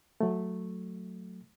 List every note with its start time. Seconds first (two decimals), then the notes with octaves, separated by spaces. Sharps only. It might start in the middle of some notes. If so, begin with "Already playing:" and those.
0.21 F#3 A3